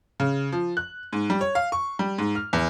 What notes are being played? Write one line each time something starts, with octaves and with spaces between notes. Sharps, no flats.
C#3
F3
F#6
G#2
G3
C#5
F5
C#6
G3
G#2
F6
E2